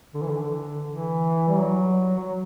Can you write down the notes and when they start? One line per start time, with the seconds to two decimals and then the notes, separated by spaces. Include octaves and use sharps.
0.14 D3
0.22 E3
0.31 D3
0.87 E3
1.48 G3
1.59 F#3
2.19 F#3